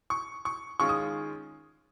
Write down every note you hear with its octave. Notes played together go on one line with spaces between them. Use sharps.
C#6
C#6
D#3 G#3 C#4 F4 C#6
D#6